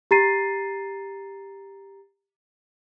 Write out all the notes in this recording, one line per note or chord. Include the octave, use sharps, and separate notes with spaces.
G4 A#5 A6 C7 D#7